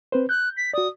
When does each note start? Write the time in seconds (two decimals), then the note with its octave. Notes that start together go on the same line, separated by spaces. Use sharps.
0.12 C4 B4 C5
0.29 F#6 G6
0.57 B6
0.73 F#4 D5 D#6